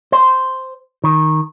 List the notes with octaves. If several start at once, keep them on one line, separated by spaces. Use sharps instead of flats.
C5
D#3